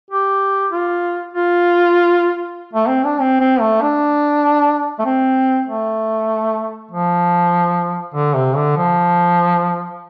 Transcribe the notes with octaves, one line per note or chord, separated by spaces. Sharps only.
G4
F4
F4
A3
C4
D4
C4
C4
A3
D4
A3
C4
A3
F3
D3
C3
D3
F3